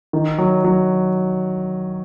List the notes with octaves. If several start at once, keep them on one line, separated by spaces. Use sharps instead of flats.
D#3
F#3
F#3